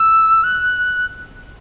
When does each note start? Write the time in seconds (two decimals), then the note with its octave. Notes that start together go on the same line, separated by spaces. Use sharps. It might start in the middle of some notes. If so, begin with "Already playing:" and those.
Already playing: E6
0.43 F#6